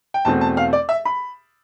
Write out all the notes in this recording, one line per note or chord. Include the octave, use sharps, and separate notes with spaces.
G5
E2 B2 A3 C4 A5
A5
F5
D5
E5
B5